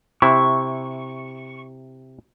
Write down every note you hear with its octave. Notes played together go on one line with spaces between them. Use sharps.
C3 E4 C#6